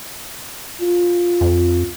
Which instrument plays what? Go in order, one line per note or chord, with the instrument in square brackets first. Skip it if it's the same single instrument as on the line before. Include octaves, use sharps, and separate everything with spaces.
[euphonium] F4
[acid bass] F2